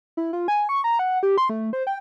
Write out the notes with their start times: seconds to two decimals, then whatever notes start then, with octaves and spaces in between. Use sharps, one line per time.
0.17 E4
0.33 F4
0.48 G#5
0.69 C#6
0.84 A#5
0.99 F#5
1.23 G4
1.38 C6
1.50 A3
1.73 C5
1.87 G5